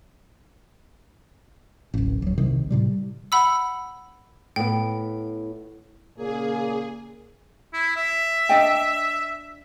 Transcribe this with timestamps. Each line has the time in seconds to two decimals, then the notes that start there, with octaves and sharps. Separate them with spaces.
1.94 D1 A1
2.22 D#1 F#3
2.38 G1 C2 C3 D#3
2.70 A2 C3 G3
3.32 F#5 B5 E6
4.56 A2 B3 G5
6.16 A#2 C#3 A#3 G#4
7.73 E4
7.96 E5
8.49 D4 D#5 G5